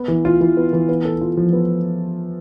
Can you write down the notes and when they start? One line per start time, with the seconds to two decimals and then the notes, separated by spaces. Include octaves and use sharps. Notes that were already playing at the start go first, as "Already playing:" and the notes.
Already playing: B3
0.08 E3
0.25 F4
0.41 E3
0.57 B3
0.73 E3
0.89 B3
1.05 A4
1.21 F4
1.37 F3
1.53 B3